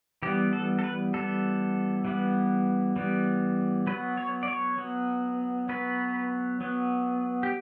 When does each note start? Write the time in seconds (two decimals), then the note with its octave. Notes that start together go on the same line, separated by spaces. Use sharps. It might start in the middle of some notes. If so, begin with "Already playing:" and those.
0.23 E3 G3 B3 G4
0.53 A4
0.79 A4
0.84 B4
1.14 E3 G3 B3 A4
2.05 E3 G3 B3
2.96 E3 G3 B3
3.87 F#3 B3 B4
4.17 C#5
4.43 D5
4.48 C#5
4.78 F#3 B3
5.69 F#3 B3 B4
6.61 F#3 B3
7.43 G4